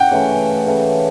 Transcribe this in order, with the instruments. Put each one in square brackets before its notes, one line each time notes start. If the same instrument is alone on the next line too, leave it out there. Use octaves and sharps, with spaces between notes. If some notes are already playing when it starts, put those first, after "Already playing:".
Already playing: [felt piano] F#5 G5
[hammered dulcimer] C#3 E3 A3 C#4
C#3 E3 A3 C#4